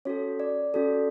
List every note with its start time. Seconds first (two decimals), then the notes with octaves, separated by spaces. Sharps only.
0.05 C#4 F#4 A4 C#5
0.40 D5
0.74 C#4 F#4 A4